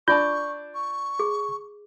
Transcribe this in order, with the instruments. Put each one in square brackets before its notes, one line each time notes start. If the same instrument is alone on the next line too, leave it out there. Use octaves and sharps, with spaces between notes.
[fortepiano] D4 D5 A5 [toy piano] F4 [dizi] C#6 [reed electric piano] G6
[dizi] C#6
[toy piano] G#4